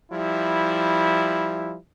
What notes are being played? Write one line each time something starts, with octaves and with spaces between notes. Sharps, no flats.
F3 G3 E4